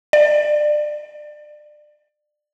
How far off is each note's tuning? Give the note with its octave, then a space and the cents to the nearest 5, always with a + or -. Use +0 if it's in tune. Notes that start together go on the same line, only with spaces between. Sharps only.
D5 +25